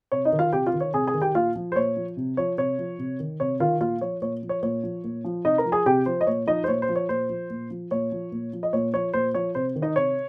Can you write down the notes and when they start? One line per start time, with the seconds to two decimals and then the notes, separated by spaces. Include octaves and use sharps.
0.12 C3 C#5
0.25 D#4 D#5
0.33 D#3
0.39 F4 F5
0.53 C3 G4 G5
0.66 F4 F5
0.73 D#3
0.80 C#5
0.94 C3 G#4 G#5
1.07 G#4 G#5
1.14 D#3
1.22 G4 G5
1.35 A#2 F4 F5
1.56 F3
1.72 C5
1.76 A#2 C#5
1.96 F3
2.17 C3
2.37 F3 C#5
2.58 C3 C#5
2.79 F3
2.99 C3
3.20 D#3
3.40 C3 C#5
3.60 D#3 F4 F5
3.80 A#2 F4 F5
4.01 F3 C#5
4.22 A#2 C#5
4.43 F3
4.49 C#5
4.63 A#2 C#5
4.83 F3
5.04 A#2
5.25 F3
5.45 C3 D#4 D#5
5.58 A#4 A#5
5.65 F3
5.72 G#4 G#5
5.86 C3 G4 G5
6.06 F3 C5
6.21 D#5
6.27 A#2 C#5
6.47 F3 D#4 D#5
6.64 C5
6.68 A#2 C#5
6.82 C5
6.89 F3
6.96 C#5
7.09 A#2 C5
7.29 F3
7.50 A#2
7.71 F3
7.91 A#2 C#5
8.12 F3
8.32 A#2
8.53 F3
8.63 D#5
8.73 A#2 C#5
8.94 F3 C#5
9.14 A#2 C5
9.34 F3 C#5
9.55 C3 C5
9.76 D#3
9.82 D#4 D#5
9.96 C3 C#5